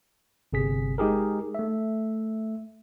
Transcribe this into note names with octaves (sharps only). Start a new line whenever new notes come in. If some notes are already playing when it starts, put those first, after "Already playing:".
G1 C3 G#4 B6
G#3 D#4 G4 G#4 A#4
A3 E5